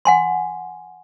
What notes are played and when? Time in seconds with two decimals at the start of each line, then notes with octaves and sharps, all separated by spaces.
0.05 F#5 G#5 C6